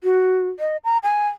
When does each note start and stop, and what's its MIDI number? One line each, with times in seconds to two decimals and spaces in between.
0.04 0.48 66
0.60 0.77 75
0.84 0.98 82
1.03 1.28 80